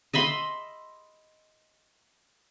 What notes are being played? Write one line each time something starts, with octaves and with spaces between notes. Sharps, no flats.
D#5 E5 B5 C6